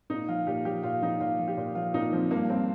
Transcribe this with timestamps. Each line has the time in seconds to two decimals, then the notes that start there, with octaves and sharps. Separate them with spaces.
0.10 A#2 D#4
0.29 F3 F4
0.47 A#2 G4
0.65 F3 G4
0.83 A#2 F4
1.02 F3 D#4
1.20 A#2 F4
1.39 F3
1.48 G4
1.57 A#2
1.75 F3 F4
1.94 A#2 D#4
2.13 F3 C4
2.31 G2 A#3
2.49 G2 C4